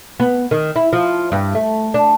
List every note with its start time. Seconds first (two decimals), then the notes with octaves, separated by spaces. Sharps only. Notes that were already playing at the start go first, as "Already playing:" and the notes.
0.20 B3
0.51 D#3
0.76 E4
0.93 F3
1.32 G2
1.55 A3
1.94 D4